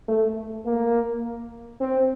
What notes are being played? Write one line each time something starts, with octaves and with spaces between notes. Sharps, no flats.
A3
A#3
C4